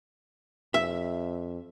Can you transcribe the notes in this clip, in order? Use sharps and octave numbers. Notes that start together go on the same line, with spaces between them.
F2 E5